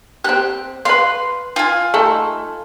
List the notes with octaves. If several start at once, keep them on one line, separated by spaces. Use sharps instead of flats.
C4 G4 F#6
B4 F5 C6
F4 G#5
A3 D#4 A4